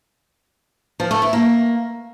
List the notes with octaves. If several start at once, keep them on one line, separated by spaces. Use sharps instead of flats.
F3
A3
E4
A#3